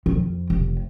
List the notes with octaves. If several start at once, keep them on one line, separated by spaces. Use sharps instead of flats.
F2
F1